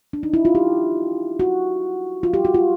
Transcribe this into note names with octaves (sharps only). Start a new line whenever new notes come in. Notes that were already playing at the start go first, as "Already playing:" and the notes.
D4
D#4
E4
F4
G4
F#4
F4
G4
F#4
F4